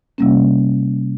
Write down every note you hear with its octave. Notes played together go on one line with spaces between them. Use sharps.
C3 G3 A#3 C#4